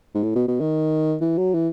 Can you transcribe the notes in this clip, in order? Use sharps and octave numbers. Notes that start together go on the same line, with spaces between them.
G#2
A2
B2
B2
D#3
E3
F#3
E3